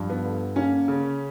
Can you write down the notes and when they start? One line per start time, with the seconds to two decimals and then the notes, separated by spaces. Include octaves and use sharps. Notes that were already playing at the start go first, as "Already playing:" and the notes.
Already playing: G2 F3
0.10 B3
0.25 D3
0.56 A#3 C#4
0.88 C#3